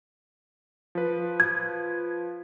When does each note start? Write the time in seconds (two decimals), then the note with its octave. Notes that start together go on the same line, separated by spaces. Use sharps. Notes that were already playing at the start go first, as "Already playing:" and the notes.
0.95 F3 B4
1.40 G#6